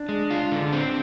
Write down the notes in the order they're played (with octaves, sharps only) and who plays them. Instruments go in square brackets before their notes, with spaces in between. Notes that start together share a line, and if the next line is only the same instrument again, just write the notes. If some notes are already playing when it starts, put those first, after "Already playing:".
Already playing: [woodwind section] D4
[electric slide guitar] G#3
F4
D3
C4